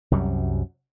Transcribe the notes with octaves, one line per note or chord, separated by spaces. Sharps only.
C2 F#2 F#3 G3